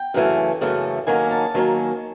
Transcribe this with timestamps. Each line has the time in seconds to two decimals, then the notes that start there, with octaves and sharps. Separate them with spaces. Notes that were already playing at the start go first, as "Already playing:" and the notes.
Already playing: G5
0.14 F#2 C#3 E3 A3
0.61 F#2 C#3 E3 A3
1.07 D#3 F#3 A#3 C#4 G#5
1.31 A5
1.54 D#3 F#3 A#3 C#4